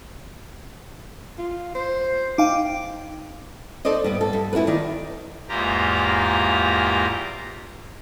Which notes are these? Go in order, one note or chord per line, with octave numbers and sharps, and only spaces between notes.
F4
C5
D#4 F5 G5 D6
D#4 A4 C5 D5 D#5
G2 B3
A4
G2
B3 E4 F#4 A4 B4
D#3 D#4 D5
E2 G#2 A#3 F4 G4 A#5